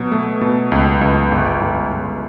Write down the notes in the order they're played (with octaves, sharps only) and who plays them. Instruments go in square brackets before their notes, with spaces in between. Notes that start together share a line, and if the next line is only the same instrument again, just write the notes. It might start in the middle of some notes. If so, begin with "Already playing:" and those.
Already playing: [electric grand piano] B2 F#3
A3
B2
C#2
C#2
G1
G1
G1